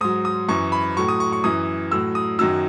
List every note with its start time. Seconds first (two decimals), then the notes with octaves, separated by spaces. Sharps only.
0.01 G#2 F#3 D#6
0.25 D#6
0.49 F#2 E3 C#6
0.72 B5
0.97 A2 F#3 C#6
1.08 D#6
1.20 C#6
1.32 C#6
1.44 F#2 E3 D#6
1.92 A2 F#3 E6
2.15 D#6
2.39 F#2 D#3 F#3 E6